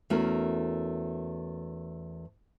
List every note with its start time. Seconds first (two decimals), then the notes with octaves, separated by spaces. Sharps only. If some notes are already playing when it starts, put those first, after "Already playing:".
0.10 E2 A3 C#4 F#4 A#4